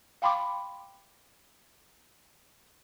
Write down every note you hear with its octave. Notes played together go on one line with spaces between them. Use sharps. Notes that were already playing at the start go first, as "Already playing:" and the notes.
F5 G5 B5 C6 D6